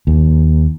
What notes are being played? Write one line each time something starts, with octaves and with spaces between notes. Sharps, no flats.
D#2